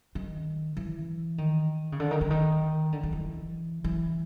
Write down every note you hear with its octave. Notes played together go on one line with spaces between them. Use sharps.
D#3
E3
D#3
C#3
D3
D#3
D3
D#3
D3
D#3
E3
E3